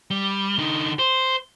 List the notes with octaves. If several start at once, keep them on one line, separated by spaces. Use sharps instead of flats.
G3
D3 D#4
C5